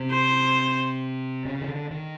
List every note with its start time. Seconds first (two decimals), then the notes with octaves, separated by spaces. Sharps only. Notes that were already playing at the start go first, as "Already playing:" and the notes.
Already playing: C3
0.11 C5
1.45 C#3
1.61 D#3
1.68 D3
1.91 D#3